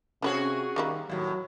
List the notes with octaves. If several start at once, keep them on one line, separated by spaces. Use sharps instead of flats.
C3 F3 C#4 F#4 G#4 B4 C#5
D#3 G3 A#3 E4
D#2 A2 F#3